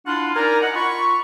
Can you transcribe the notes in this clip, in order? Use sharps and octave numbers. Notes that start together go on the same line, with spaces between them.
D4 E4 F4 F#5 C6
D#4 A#4 D5 G#5 A#5
D#5 F#5
F4 B5 C#6